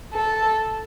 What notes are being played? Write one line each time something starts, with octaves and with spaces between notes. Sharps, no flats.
A4